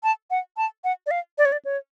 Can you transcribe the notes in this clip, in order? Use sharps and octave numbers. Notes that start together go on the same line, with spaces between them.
A5
F#5
A5
F#5
D5
F5
D5
C#5
D5
C#5